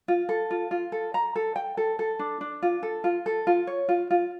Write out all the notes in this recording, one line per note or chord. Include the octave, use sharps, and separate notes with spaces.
F4
A4
F4
F4
A4
A#5
A4
G5
A4
A4
D4
D4
F4
A4
F4
A4
F4
C#5
F4
F4